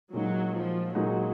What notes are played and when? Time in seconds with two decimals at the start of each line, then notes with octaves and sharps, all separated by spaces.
0.13 A#2 F#3 G#3 D#4 F#4
0.54 F3
0.95 A#2 F#3 G#3 D#4 F#4